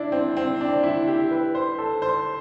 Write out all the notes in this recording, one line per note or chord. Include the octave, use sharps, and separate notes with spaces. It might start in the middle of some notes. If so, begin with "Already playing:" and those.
Already playing: D4 E4
C4
C4
D4
E4
G4
B4
C5
A4
C5